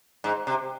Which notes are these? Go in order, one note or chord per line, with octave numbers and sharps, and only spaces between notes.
G#2
C3